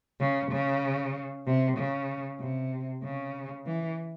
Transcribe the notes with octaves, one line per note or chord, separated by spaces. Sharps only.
C#3
C#3
C3
C#3
C3
C#3
E3